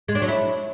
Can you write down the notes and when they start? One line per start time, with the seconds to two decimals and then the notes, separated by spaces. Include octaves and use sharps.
0.08 G#3
0.15 D4
0.22 F#3
0.28 E4